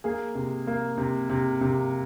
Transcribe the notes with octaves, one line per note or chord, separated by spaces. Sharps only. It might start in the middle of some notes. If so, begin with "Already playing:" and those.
A#3 G#4
C3
A#3
C3
C3
C3